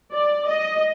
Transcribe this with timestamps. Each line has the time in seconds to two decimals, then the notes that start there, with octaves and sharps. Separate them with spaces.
0.12 D5
0.48 D#5